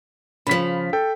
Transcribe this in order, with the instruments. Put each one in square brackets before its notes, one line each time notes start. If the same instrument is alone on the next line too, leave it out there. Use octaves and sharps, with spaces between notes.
[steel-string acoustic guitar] C#3 F3 [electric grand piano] B5 B6
[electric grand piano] A4 G5